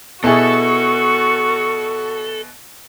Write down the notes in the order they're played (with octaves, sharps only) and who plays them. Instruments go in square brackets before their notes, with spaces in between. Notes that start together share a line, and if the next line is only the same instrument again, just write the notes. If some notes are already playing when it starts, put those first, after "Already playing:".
[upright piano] B2 E4 G#4 [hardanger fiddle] F#4 [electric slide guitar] A4 [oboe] C#6